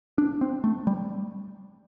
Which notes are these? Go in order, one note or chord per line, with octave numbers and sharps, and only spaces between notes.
D4
C4
A3
G3